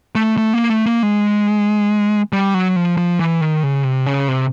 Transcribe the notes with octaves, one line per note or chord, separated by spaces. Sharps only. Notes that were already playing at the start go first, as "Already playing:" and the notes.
A3
A3
A#3
A3
A#3
G#3
G3
F#3
F3
F3
E3
D#3
C#3
C3
C#3
C3